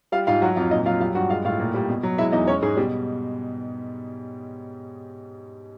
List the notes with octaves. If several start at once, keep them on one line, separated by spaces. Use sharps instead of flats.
G3 F4 F5
G#2 F4 F5
F#3 F#4 F#5
F2 F4 F5
A#2 D#4 D#5
F#3 F4 F5
G3 F4 F5
G2 F#4 F#5
G#3 F4 F5
A2 F4 F5
A#2
G3
B2
F#3
G#3 E4 E5
E2 D#4 D#5
G#3 C#4 C#5
G#2 G#3 G#4
B2 G3 G4